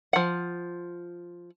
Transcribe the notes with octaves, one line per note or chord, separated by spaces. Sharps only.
F3 F#5